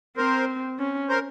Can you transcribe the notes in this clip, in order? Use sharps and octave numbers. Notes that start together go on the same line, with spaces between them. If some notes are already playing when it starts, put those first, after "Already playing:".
C4 A#4 C5
C#4
A#4 C5